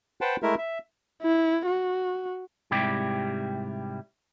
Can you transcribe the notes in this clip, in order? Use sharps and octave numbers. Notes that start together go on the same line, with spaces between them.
B4 C5 F#5 G5 A5
G#3 A3 E4 A#4 E5
E5
E4
F#4
G#2 C3 G3 E4 G4